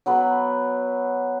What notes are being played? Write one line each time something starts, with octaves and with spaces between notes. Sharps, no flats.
F#3 B3 B4